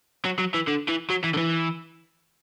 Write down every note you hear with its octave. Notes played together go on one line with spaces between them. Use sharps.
F#3
F#3
E3
D3
E3
F#3
E3
D3
E3